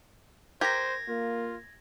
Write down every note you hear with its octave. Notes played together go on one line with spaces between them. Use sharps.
G4 A#4 C5 A#5 G#6 A#6
A#3 F4